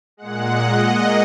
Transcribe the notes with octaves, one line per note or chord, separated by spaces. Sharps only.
A#2 G#3 F#5
D#5